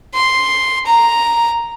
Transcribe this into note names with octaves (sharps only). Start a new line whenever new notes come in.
C6
A#5